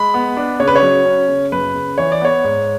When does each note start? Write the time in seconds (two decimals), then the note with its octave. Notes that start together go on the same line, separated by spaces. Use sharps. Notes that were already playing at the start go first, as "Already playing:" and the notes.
Already playing: G#3 B5
0.14 B3
0.37 D4
0.60 C#3 C#5
0.68 B4
0.76 C#5
0.82 F#3
1.05 C#4
1.28 C#3
1.52 F#2 B4
1.74 C#3
1.98 E3 C#5
2.12 D5
2.21 B3 C#5
2.44 G#2